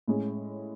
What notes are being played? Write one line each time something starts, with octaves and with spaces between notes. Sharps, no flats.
A2 G#3 C#4